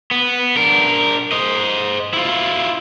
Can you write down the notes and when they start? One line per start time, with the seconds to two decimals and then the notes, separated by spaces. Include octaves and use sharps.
0.11 B3
0.57 D4 A#4
1.32 C5 D#5
2.14 E4 F4